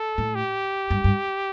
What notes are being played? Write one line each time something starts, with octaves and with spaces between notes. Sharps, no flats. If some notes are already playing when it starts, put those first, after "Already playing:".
Already playing: A4
A2
G4
G2
G2